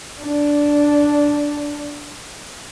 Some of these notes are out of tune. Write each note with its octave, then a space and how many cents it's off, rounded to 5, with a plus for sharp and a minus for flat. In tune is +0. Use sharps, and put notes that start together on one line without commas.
D4 -5